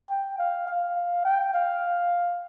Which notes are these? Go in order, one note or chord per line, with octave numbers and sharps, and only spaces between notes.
G5
F5
F5
G5
F5